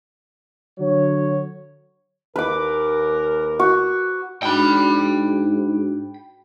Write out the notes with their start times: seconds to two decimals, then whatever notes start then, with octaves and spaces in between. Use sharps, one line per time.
0.80 D3 F#3 C#5
2.36 D#2 A#4 B4 D6
3.59 F#4
4.43 G#2 D4 F#4 G5 B5